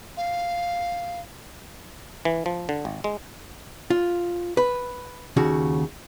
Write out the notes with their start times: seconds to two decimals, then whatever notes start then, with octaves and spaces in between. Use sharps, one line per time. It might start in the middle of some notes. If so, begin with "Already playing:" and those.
0.17 F5
2.25 E3
2.46 F3
2.69 D3
2.85 G#1
3.04 G#3
3.90 F4
4.57 B4
5.37 D#2 C#3 F#4